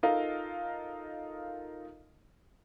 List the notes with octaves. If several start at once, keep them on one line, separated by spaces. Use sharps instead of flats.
D#4 F4 A4 A#4 D#5 F5